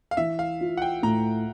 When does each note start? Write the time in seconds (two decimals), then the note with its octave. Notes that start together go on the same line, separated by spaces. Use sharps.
0.11 F5
0.17 E3 E5
0.39 F5
0.61 F4
0.77 F#5
0.82 G5
1.02 A2 A#5